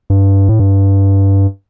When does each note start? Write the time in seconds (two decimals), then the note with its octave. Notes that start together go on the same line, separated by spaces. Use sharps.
0.10 G2
0.49 A2
0.60 G2